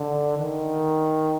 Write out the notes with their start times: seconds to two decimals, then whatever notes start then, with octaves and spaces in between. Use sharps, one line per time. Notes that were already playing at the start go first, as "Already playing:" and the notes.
Already playing: D3
0.37 D#3